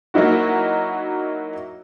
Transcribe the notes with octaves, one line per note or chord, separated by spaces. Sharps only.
F#3 A#3 D#4 E4 F#4